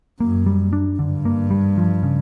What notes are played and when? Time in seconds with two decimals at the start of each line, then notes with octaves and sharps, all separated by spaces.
0.20 F#2 A#3
0.46 G3
0.73 D4
0.99 G2 D3
1.25 A#3
1.51 G3
1.78 F3
2.03 C#3